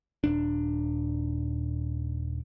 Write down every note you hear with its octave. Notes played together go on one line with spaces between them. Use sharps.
D#1 D4